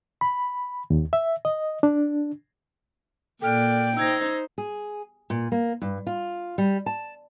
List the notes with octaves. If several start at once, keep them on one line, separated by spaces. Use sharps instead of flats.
B5
D#2
E5
D#5
D4
A#2 A4 D5 G5 F6 F#6
D#4 C5 E6 G#6 A#6
G#4
A#2
A#3
G2
F4
G3
A5